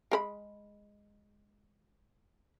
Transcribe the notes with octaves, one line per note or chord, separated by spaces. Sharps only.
G#3 A#4 B5